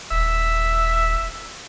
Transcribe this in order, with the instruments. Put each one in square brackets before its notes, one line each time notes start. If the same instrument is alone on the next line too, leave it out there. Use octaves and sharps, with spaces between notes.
[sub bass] D#1 [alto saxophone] E5